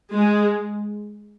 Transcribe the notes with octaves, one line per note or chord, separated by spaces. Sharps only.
G#3